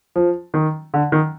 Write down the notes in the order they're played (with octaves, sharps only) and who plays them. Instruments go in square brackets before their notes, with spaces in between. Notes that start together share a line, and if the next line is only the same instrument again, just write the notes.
[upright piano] F3
D#3
D3
D#3